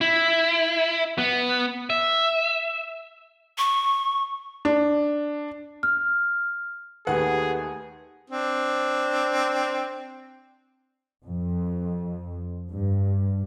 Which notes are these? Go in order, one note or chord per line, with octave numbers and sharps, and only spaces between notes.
E4
B3
E5
C#6
D4
F6
D#2 D#3 A3 G4 G#4 B4 F#5
C4 D4
F2
G2